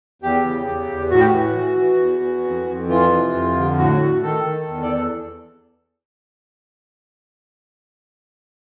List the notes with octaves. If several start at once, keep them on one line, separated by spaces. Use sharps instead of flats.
E2 G4
C#3
E2
E2
A2 F#4
G4
F#4
E3
E3
E3
E2
E3
F2
F2
E3 F4
C3
F2
D3
A2 F#4
A2
D#3 A4
D#3
E2
D5